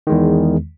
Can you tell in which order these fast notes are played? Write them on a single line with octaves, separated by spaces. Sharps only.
D#3 G#3 E2